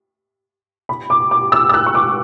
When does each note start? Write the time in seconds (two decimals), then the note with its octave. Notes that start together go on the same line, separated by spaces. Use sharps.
0.89 B5
1.10 D6
1.31 D6
1.52 E6
1.69 E6
1.74 F#6
1.86 C#6
1.95 D6